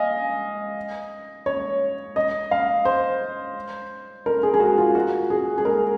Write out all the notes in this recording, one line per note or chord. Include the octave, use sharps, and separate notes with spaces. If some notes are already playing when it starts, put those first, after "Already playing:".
Already playing: D#5 F5 G#5
C#5
D#5
F5
C5
A#4
G#4
G#4
F#4
F4
F#4
G#4
G#4
A#4